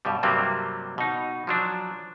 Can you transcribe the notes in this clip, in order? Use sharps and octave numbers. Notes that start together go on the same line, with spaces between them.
G2 B2 G3
G2 C3 F#3 G3 A#3 C4
B2 D#4
F3 F#3 D4